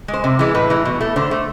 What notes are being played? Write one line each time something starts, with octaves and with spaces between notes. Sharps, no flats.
G#3
C5
C3
E3 G#3
A2 B4
E3 G#3
B2
A3
D3 C5
A3